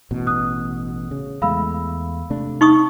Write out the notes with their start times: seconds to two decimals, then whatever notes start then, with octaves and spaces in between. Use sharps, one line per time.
0.11 A1 B2
0.27 D#6 F#6
1.11 C#3
1.42 E2 G#3 A3 F5 B5 E6
2.30 C3 A3 D4
2.61 D#4 C#6 D#6